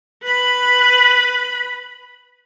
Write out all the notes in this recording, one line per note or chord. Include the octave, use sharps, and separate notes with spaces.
B4 B5